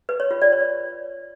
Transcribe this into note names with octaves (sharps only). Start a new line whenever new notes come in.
B4
C#5
F4
D5
C#5